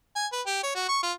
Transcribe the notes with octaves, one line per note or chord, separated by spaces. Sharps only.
G#5
B4
G4
C#5
F#4
C#6
F4